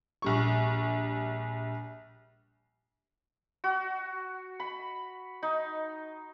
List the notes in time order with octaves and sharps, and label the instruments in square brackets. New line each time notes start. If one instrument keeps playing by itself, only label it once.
[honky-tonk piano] A#1 G3 C#6
[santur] F#4
B5
D#4